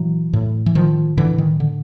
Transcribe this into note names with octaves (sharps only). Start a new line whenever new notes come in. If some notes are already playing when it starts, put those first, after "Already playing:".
Already playing: A#2 E3 F#3
A2
E3
D#3 F3
A2 D3 E3
D#3
D3